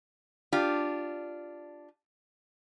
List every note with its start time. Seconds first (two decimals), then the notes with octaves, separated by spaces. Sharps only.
0.53 D4 F4 G4